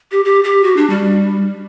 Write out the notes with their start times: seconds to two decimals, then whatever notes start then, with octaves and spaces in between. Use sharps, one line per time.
0.12 G4
0.25 G4
0.44 G4
0.64 F#4
0.77 D4
0.90 G3